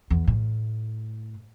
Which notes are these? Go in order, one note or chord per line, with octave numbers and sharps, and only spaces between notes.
E2
A2